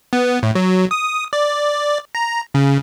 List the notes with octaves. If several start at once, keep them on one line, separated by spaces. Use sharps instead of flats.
B3
A2
F#3
D#6
D5
A#5
C#3